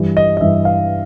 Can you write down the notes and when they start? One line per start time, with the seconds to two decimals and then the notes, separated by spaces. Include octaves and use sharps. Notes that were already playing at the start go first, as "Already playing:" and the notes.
Already playing: G2 E3 G3
0.17 D#5
0.37 D#5
0.41 G2 E3 G3 E5
0.65 F5